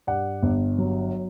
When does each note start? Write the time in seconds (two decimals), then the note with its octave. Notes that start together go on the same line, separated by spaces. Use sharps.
0.07 G2 D5 F#5
0.43 G1
0.78 F#3